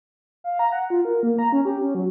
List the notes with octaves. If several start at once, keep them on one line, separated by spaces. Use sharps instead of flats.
F5
A#5
F#5
F4
A#4
A#3
A#5
C#4
G4
C#4
F#3